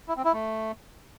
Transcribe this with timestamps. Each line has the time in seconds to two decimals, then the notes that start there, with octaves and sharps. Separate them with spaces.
0.08 E4
0.17 C4
0.25 E4
0.33 A3